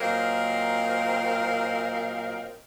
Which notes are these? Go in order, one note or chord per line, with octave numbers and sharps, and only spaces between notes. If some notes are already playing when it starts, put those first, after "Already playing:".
A#2 F#3 C4 A#4 D#5 F5